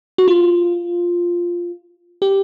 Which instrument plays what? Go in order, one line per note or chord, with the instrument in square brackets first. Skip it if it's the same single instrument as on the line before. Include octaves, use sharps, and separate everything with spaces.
[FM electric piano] F#4
F4
G4